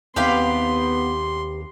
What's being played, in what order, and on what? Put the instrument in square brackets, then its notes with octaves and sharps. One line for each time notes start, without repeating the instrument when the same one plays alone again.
[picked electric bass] D#2 C4 [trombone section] B3 [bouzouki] G4 B4 F5 [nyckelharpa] C6